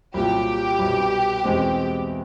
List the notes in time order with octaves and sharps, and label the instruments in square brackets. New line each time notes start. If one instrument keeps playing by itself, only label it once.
[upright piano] C2 A#2 F#3 [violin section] G4
[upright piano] C2 B2 G3
E2 B2 G#3 C4